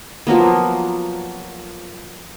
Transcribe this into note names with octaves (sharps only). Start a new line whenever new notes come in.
F3 F#3 A#3 B3